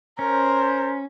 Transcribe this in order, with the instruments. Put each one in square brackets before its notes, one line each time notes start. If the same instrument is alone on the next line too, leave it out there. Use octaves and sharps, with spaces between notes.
[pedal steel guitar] C#4 [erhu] A#4 [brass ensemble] C5